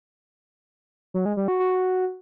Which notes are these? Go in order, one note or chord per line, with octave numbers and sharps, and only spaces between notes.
F#3
G#3
G3
F#4
F#4